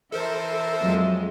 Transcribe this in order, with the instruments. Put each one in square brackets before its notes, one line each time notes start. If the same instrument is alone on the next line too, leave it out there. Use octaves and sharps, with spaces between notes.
[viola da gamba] E3 [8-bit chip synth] A4 A#4 C5 [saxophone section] E5
[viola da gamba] F2 G#3 [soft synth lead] F#3